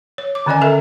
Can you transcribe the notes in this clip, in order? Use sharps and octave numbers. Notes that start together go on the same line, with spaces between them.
C#5
D6
D3 D#3 C#4 D5 D#5 G#5
D3 A4 A#4 E5